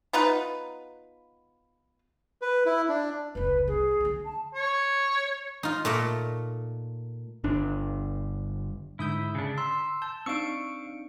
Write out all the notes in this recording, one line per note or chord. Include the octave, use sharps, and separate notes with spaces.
B3 D#4 F4 B4
B4
E4
D4
F1 C#2 B4
C2 G#4
D3 D4
A5
C#5
D#4 F4
A#2 A3 D#5
G1 D4
G#2 D3 E4 D#6 G6 B6
C#3 D4
A#5 C6 E6
A5 G6
C4 D4 D#4 F5 C#6 E6 C#7 D7